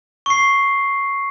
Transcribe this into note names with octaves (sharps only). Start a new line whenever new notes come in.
C#6 C7